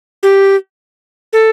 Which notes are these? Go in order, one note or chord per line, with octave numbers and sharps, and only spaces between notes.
G4
A4